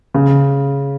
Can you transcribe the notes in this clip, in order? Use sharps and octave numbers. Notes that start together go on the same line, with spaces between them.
C#3